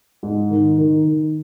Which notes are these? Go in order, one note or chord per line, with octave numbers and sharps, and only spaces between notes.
G#2
D#3
D#3
D#3